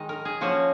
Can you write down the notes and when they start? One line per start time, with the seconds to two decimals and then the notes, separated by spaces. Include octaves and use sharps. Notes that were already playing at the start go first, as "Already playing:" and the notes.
Already playing: D#3 G#3 D#4 D#5
0.09 A#4
0.25 G#4
0.41 F3 A#3 C#4 F#4